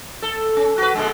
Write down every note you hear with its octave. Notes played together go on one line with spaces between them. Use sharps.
A4
C#4
F#4 B4
A#2 D3 G#3